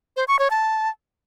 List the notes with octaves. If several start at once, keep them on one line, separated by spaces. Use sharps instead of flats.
C5
C#6
C#5
A5